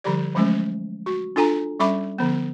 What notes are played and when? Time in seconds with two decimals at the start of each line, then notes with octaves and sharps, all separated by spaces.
0.04 D3 F3 G3 G4 D5
0.35 F3 F#3 G#3 A3 C#4
1.06 F#4
1.36 D4 F4 A4 G#5 A#5
1.80 G3 C#4 A4 E5 B5 D6
2.18 D3 F3 B3